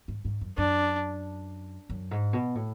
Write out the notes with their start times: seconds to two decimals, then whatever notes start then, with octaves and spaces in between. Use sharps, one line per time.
0.08 G#2
0.25 G#2
0.41 F#2
0.57 F#2 D4
1.90 F#2
2.11 G#2
2.33 B2
2.55 A2